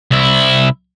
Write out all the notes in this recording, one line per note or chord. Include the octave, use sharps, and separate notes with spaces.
C2 E4